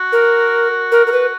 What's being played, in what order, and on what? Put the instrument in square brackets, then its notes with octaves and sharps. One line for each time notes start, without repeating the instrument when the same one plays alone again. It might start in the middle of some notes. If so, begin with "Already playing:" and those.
Already playing: [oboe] F#4
[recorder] A#4
A#4
A#4
B4